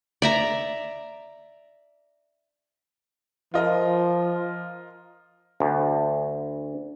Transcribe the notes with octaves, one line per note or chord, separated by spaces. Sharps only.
D5 E5 A#5
F3 F4 A#4 D#5
D2